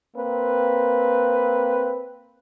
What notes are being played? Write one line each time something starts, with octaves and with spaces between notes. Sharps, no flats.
A#3 C4 B4